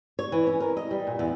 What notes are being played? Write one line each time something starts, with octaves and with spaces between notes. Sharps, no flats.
C#5
E3
C#4
A#4
D#5
G3
A#2
E2